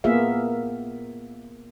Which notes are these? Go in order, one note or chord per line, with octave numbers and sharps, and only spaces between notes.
A#3 B3 F4 G#4 E5 F5